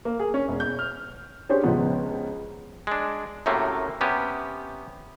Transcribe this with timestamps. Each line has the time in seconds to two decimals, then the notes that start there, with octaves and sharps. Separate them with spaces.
0.05 A#3
0.20 G#4
0.34 C#4
0.48 E1
0.60 G6
0.79 F6
1.49 C#4 D4 G4 G#4 C5 C#5
1.63 C#2 C#3 F3 B3
2.87 G#3 D4
3.46 F#2 A2 C3 A3 A#3
4.01 C3 B3 C#4 G4